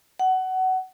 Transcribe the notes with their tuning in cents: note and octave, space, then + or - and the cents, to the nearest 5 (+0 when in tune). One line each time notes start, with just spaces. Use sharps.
F#5 +20